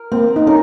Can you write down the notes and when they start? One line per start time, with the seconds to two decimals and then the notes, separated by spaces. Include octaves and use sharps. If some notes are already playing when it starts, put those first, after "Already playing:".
Already playing: A#4
0.12 A#3 C4
0.36 D#4
0.47 C#4 A#4